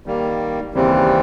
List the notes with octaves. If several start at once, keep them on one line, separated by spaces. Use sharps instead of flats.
D#3 G3 A#3
D#2 C#3 E3 G3 C4